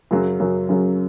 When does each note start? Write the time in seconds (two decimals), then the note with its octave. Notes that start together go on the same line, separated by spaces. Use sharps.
0.11 F#2 C#3 F#3
0.40 F#2 C#3 F#3
0.69 F#2 C#3 F#3